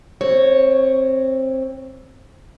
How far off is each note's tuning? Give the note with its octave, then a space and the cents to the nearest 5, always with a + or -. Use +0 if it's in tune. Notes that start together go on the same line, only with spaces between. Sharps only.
C4 +15 C#5 +0